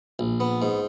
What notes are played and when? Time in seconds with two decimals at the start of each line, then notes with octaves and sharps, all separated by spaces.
0.19 A#1
0.40 B3
0.62 G#2